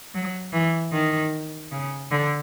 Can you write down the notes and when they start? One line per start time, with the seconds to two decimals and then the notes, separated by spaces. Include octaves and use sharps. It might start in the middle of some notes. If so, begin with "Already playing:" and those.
0.15 F#3
0.53 E3
0.93 D#3
1.72 C#3
2.11 D3